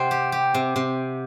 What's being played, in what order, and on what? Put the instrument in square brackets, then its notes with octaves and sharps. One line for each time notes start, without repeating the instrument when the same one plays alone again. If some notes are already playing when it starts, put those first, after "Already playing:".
Already playing: [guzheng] C3 C4 [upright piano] F#5
[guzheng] G4
G4
C3
C3